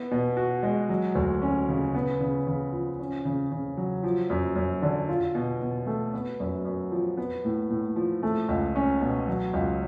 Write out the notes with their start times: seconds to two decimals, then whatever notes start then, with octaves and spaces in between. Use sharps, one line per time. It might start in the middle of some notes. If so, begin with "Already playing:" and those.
Already playing: B3
0.11 B2
0.37 F#4
0.63 G#3
0.89 F#3
1.15 D2
1.42 C#4
1.68 C#3
1.95 B3
2.21 C#3
2.47 C#3
2.72 F3
3.00 C#4
3.25 C#3
3.52 C#3
3.77 F#3
4.03 F3
4.30 F#2
4.56 F#2
4.82 D3
5.08 F4
5.35 B2
5.61 B2
5.87 A3
6.14 B3
6.40 F#2
6.65 F#2
6.91 F3
7.17 B3
7.45 A2
7.70 A2
7.96 F3
8.23 A3
8.49 C#2
8.76 C#4
9.01 B2
9.28 F#3
9.53 C#2